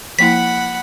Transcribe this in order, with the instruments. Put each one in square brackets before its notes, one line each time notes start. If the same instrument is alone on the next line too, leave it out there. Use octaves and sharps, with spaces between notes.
[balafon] F3 A#3 E4 [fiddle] F#5 B5 [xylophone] B6